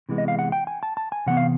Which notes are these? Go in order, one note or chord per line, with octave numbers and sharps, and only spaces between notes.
C3 E3 G#3 B3
D#5
F5
F#5
G5
G#5
A5
A5
G#5
C3 E3 B3 F#5
F5